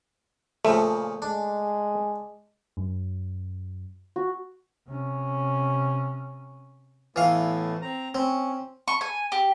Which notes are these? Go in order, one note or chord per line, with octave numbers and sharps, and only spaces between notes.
A#2 C#3 F3 A3
G#3 D4
F#2
F#4
C3 C#4
A2 E3 A3 B3 F5
C4 A#5
C4 C#4
C#6
G#5
G4